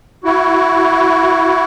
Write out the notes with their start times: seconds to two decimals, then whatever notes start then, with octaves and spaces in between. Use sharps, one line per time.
0.24 E4 F#4